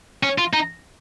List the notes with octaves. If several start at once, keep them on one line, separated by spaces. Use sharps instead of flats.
C#4
F4
D#4